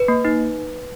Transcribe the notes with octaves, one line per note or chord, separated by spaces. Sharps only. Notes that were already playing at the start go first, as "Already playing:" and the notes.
Already playing: B4
A#3
D#4